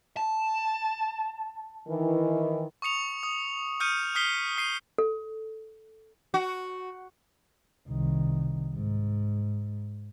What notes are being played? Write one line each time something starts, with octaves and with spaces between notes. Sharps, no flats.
A5
D#3 E3
C#6 D#6 C#7 F7
D#6
D#6 F6 G6 C#7 D#7
D#6 F6 B6 C7 G7
D#6 C7 D#7
A4
F#4
C2 D#3
G#2